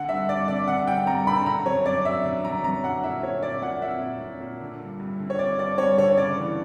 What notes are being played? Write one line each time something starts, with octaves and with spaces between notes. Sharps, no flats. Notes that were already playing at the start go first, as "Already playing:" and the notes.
Already playing: D3 F#5
G2 E5
G2 D5
D3 D5
D3 F#5
G2 G5
G2 A#5
D3 B5
D3 A#5
F#2 C#5
F#2 D5
D3 E5
D3
F#2 A#5
F#2 A#5
D3 F#5
A#2 E5
A#2 C#5
A#2 D5
A#2 F#5
A#2 E5
A#2
A#2
A#2
D3
G2
G2
D3
C#5
D3 D5
G2 D5
G2 C#5
D3 C#5
C#3 D5
E3